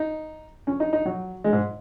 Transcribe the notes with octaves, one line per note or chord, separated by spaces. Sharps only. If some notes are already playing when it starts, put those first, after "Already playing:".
Already playing: D#4
C#4
D#4
D#4
F#3
G#3
G#2